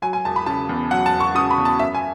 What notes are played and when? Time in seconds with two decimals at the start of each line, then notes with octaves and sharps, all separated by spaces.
0.02 F#3 G#5
0.13 G#5
0.25 E1 A5
0.36 B5
0.46 C#3 A5
0.69 E2
0.91 F#3 F#5
1.06 A5
1.13 E1
1.20 C#6
1.35 C#3 D#6
1.50 B5
1.58 E2
1.65 A5
1.79 F#2 E5
1.95 G#5